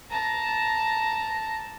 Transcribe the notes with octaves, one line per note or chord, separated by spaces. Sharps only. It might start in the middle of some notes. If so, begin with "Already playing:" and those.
A5 A#5